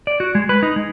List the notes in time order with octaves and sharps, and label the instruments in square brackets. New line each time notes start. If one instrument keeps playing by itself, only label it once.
[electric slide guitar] D5
F#4
G#3
B4
D#4
G#3